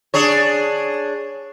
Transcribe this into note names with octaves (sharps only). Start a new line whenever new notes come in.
D4 G#4 C#5